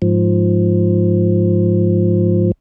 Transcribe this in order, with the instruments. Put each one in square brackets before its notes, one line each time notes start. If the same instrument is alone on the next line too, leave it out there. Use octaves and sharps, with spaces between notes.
[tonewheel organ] G#2 F3